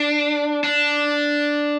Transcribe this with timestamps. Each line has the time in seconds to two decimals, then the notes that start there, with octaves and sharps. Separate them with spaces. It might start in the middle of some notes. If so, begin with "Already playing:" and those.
Already playing: D4
0.64 D4